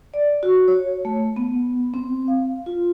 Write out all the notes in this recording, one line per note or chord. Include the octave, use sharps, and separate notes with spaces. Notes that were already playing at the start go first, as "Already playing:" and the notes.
D5
F#4
C#5
A3
B3
C4
F5
F4